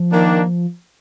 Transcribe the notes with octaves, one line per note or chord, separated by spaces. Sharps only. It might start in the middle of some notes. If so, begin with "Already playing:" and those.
Already playing: F3
D#3 A#3 D4